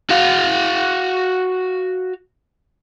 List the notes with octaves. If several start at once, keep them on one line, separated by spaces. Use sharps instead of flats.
F#4 F5